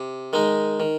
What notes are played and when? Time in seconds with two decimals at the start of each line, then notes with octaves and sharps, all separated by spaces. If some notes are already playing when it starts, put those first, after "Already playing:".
Already playing: C3
0.33 D#3 G#3 D#4
0.80 D#3